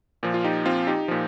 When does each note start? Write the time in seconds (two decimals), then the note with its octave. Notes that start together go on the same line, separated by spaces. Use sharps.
0.23 A#2 F3
0.34 F4
0.44 D#4 G4
0.66 C4 F4
0.87 D#4 G4
1.08 A#2 F3